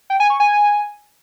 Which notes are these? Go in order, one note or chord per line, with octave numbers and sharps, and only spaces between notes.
G5
G#5
C#6
G#5